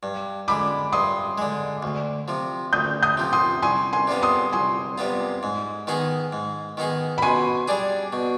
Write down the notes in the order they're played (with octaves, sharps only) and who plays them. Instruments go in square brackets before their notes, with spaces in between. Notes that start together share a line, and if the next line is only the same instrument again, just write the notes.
[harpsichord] G2
[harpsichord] D3 G#3 [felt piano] B5 D6
[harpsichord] G2 [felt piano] C6 D#6
[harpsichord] D3 G#3
D2
C3 F3
[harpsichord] D2 [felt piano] D#6 G6
[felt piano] D#6 G6
[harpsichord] C3 F3
[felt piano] C6 D#6
[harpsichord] C2 [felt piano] G#5 C6
[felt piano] G#5 C6
[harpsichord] C3 G3 B3 F4
[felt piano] C6 D#6
[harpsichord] C2 [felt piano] G#5 C6
[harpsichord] C3 G3 B3 F4
G#2
D#3 B3 D#4 G#4
G#2
D#3 B3 D#4 G#4
[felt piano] B5
[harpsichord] B2 [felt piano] G#5 C6
[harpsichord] G3 D4 G#4
B2